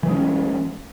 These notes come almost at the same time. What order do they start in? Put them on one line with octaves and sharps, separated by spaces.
E3 G#3 C#4